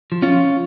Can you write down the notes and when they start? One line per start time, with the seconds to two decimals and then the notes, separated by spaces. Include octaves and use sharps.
0.12 F3
0.22 C#4 F4
0.34 F3